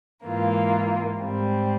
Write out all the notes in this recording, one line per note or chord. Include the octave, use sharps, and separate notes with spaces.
G#2 E3 A#3 F4
G#2 G3 C4